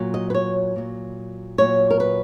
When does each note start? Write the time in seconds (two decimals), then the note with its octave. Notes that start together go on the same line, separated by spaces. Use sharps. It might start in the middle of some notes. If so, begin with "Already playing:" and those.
Already playing: A#2 F#3
0.14 D#5
0.30 B4
0.34 C#5
0.76 A#2 F#3
1.58 A#2 F#3 C#5
1.90 A#4
2.00 B4